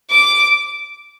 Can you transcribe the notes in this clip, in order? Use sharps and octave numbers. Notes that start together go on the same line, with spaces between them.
D6